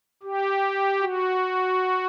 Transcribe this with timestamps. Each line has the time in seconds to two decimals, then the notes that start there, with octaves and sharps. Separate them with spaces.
0.23 G4
1.01 F#4